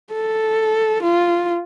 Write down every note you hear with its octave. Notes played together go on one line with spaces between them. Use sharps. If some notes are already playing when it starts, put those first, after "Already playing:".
A4
F4